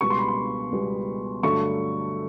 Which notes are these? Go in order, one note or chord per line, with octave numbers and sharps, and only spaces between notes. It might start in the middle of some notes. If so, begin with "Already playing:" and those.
C#2 B2 G3 B3 C#6
C6
B5
C6
C#2 B2 G3 B3
G2 D3 F#3 A3 C#6